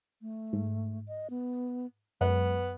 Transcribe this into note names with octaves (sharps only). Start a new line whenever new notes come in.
A3
G#2
D#5
B3
F#2 G#3 B3